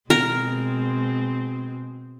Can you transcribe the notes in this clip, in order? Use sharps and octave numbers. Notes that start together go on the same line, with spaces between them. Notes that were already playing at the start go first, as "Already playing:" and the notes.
B2 G#3 C4 A#4